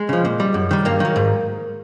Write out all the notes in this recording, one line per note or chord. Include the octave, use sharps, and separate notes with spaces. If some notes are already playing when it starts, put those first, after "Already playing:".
Already playing: G#3
C#3 F3
A#2
G3
F#2
D#3 G3
G2 A#3
D#3 F#3
G#2